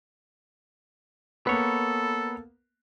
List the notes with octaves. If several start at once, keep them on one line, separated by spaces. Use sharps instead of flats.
A#3 B3 A4 B4 C#5